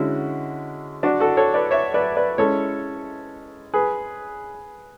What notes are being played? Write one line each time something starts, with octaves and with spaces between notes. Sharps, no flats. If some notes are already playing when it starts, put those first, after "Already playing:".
Already playing: D3 G#3 C#4 E4 F#4
D4 F#4
F#4 A4
A4 C#5
B4 D5
C#5 E5
B4 D5
B4 D5
G#3 C#4 E4 A4 C#5
G#4 B4